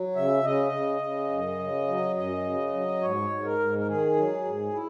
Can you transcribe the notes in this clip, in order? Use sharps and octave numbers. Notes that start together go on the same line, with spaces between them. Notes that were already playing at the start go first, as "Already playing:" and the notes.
Already playing: F#3
C#3 E5
C#3 D#5
C#3
C#3
F#2
C#3
F#3
F#2 D#5
C#3
F#3
G#2 C#5
G#2
A#4
G#2
A#4
D#3 G#4
F#3
G#2
E4